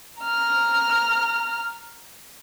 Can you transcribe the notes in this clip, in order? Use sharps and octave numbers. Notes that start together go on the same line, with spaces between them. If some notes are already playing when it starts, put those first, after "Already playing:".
A#5 F6